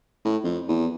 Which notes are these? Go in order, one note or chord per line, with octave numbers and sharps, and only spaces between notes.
A2
F2
E2